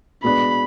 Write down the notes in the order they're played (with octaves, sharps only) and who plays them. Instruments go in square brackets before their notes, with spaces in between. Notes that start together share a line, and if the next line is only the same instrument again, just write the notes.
[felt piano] B2 G#3 B3 D4 [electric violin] B5